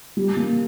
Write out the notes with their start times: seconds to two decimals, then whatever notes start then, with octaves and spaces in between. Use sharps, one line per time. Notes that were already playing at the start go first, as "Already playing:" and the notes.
0.17 G3
0.37 A#3